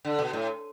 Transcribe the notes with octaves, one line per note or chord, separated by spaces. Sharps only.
D3
B2
A2